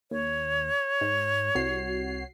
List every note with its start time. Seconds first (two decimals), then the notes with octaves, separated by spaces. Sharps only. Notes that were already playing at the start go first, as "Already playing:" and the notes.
0.11 D#2 C#5
1.01 G#2
1.55 C2 F#4 C7